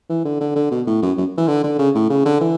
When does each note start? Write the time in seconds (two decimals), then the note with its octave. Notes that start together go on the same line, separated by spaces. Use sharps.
0.09 E3
0.25 D3
0.40 D3
0.55 D3
0.71 B2
0.87 A2
1.02 F#2
1.17 F#2
1.37 E3
1.48 D3
1.63 D3
1.79 C#3
1.94 A2
2.10 C#3
2.25 D3
2.41 E3